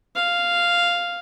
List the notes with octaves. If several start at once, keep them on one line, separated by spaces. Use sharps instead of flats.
F5